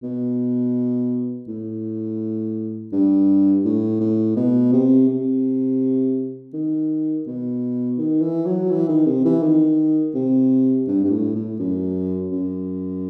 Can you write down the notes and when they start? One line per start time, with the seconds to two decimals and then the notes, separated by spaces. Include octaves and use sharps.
0.03 B2
1.47 A2
2.92 G2
3.64 A2
4.00 A2
4.36 B2
4.73 C3
5.09 C3
6.53 D#3
7.26 B2
7.98 D#3
8.21 E3
8.46 F#3
8.70 E3
8.88 D#3
9.06 C3
9.25 E3
9.43 D#3
10.15 C3
10.87 G2
11.04 G2
11.11 A2
11.35 A2
11.59 F#2
12.32 F#2